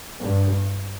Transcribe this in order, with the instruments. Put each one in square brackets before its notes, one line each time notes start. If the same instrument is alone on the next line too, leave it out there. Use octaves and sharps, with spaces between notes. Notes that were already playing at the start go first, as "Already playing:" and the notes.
[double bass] G2